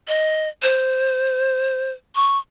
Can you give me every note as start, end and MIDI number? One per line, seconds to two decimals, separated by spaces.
0.08 0.48 75
0.63 1.91 72
2.16 2.38 85